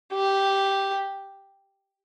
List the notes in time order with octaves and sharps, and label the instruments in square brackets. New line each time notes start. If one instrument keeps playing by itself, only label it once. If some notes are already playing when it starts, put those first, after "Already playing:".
[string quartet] G4